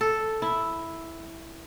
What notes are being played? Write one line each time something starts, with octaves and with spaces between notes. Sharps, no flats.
A4
E4